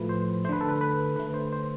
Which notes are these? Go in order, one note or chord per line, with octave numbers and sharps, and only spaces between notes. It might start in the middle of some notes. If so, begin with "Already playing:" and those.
Already playing: A2 F3 A3 B4
C5
D3 A3 B4 C5
A4
B4
B4
D3 A3 B4
C5
C5